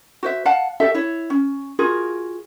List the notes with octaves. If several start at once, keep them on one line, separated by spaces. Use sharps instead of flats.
F#4 C5 E5
F5 F#5 A5
F#4 G4 A4 E5
E4 C#5
C#4
F4 F#4 G#4 A#4